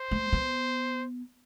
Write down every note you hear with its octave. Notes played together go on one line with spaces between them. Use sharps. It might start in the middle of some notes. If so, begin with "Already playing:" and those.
Already playing: C5
A3
B3